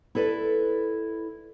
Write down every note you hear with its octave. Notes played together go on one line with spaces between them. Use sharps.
E4 A4 B4 D5